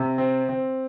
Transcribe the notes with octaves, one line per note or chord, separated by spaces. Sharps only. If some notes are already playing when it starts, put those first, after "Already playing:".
Already playing: C3
C4
C4